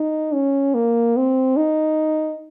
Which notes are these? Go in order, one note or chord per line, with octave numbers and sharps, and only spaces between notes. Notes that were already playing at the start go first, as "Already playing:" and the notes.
Already playing: D#4
C#4
A#3
C4
D#4